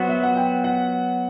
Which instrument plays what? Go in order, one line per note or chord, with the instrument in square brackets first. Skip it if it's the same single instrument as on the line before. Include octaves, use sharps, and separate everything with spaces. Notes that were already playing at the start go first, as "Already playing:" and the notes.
Already playing: [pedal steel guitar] F#3 B3 F#4 C5
[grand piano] E5
F#5
G5
F#5